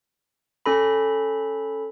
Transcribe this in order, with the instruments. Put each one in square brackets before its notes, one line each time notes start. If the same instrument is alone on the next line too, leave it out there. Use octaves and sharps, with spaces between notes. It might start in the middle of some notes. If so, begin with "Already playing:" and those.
[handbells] C#4 A4 B5